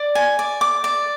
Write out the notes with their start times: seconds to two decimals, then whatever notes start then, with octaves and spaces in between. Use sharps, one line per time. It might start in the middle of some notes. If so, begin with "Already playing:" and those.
Already playing: D5
0.15 G#5
0.39 D5
0.61 D6
0.84 D5